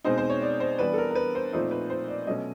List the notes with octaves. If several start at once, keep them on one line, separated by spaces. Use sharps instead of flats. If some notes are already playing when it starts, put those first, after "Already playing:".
B2 G#3 C4 D#4 C5
C5
C#5
D5
C5
E3 G3 B3 D4 B4
A4
A#4
A#4
B4
C5
A#2 F3 A3 C4 D#4 C5
B4
C5
D5
B2 F#3 A3 C#4 D#5